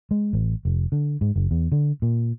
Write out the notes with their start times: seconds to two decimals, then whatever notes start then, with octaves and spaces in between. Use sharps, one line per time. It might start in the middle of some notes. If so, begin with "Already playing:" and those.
0.11 G#3
0.33 A1
0.65 F1
0.92 D3
1.21 G#2
1.36 F#1
1.51 E2
1.72 D3
2.02 A#2